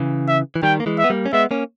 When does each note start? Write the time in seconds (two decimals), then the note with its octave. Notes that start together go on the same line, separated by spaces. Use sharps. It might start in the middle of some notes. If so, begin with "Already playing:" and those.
Already playing: C#3 E3
0.28 E5
0.56 E3
0.63 D#3 G3 G5
0.80 A#3
0.86 E3 G#3
0.98 E5
1.04 B3
1.10 G3 A#3
1.26 C#4
1.33 G#3 B3 E5
1.51 A#3 C#4